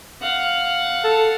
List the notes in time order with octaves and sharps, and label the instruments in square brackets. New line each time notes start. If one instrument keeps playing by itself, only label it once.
[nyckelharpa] F5 F#5
[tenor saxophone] A4